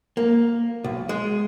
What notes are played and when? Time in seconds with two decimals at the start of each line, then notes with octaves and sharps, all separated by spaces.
0.17 A#3
0.84 B1
1.09 G#3